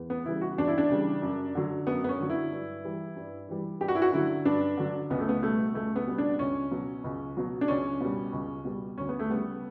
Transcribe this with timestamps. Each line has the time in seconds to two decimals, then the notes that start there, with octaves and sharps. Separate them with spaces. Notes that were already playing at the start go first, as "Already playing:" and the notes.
Already playing: E2
0.10 B3
0.25 C#3 E3 G3 E4
0.41 F#4
0.58 E2 D4
0.68 E4
0.78 D4
0.90 C#3 E3 G3
1.22 F#2
1.55 D3 F#3
1.86 F#2 B3
2.04 B3
2.09 C#4
2.19 D3 F#3
2.30 E4
2.52 G2
2.85 E3 G3
3.16 G2
3.49 E3 G3
3.80 G2 G4
3.88 F#4
3.95 E4
4.02 F#4
4.13 D3 F#3 E4
4.45 G2 D4
4.77 D3 F#3
5.10 C#2 B3
5.20 A3
5.29 B3
5.42 B2 G3 A3
5.74 C#2 A3
5.96 B3
6.07 B2 G3
6.18 D4
6.39 C#2 C#4
6.71 B2 F#3
7.04 C#2
7.37 B2 F#3
7.61 D4
7.68 C#2 C#4
8.01 B2 G3
8.33 C#2
8.65 B2 G3
8.98 D2 C#4
9.09 B3
9.19 A3
9.30 C#3 G3 B3